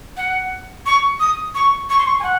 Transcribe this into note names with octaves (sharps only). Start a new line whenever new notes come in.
F#5
C#6
D#6
C#6
C#6
C6
C#6
G#5
F#5